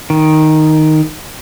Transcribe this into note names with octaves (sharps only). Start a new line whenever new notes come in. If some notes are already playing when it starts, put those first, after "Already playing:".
D#3